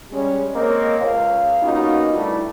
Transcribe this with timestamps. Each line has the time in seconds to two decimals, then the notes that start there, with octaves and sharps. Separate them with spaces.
0.11 G3 G#3 C#4
0.54 G#3 A#3 C4 C#5 D#5
1.00 C#2 F5
1.62 A#3 B3 C#4 D#4 F4 F#4
2.13 G2 G3 A3 E4